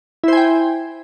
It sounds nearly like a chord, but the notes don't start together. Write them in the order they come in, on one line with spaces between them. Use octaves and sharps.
E4 C5 G#5 G5